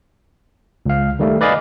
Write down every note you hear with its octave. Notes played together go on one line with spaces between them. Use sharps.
C#2 F5
D#3 G3 A3
B4 D5 D#5 F5 G#5 B5